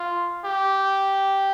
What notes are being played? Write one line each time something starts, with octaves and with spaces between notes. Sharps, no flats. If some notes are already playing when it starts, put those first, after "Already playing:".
Already playing: F4
G4